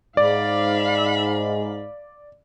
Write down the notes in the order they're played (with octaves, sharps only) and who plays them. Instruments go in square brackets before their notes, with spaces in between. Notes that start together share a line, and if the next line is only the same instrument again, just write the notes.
[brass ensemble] G#2 [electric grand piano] D5 [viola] F5 B5